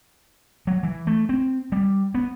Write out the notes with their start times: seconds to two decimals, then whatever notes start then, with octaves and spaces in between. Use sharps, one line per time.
0.67 F#3
0.83 E3
1.07 A3
1.29 C4
1.72 G3
2.14 B3